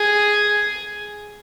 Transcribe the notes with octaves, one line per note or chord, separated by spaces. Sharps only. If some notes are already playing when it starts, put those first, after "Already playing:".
Already playing: G#4